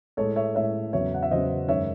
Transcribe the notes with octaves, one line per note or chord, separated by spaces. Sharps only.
A2 G#3 A4 C#5
C#5 E5
A2 G#3 C#5 E5
E2 C#3 F#3 C#5 E5
F#5
E5
E2 C#3 F#3 C5 D#5
F#2 D#3 G#3 C#5 E5